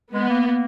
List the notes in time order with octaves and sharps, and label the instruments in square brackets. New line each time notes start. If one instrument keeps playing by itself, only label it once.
[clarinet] G#3 [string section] B3
[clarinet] A#3
A#3